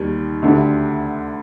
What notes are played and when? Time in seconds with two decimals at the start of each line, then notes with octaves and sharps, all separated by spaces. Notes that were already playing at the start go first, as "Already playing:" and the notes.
Already playing: D#2 D#3 G3
0.42 D2 D3 A3 D4 G4